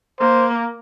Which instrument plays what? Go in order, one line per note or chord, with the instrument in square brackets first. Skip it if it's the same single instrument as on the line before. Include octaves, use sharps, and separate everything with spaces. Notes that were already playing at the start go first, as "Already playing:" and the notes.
[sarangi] A#3 [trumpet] C5